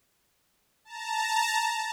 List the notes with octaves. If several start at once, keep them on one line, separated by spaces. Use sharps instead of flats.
A5 A#5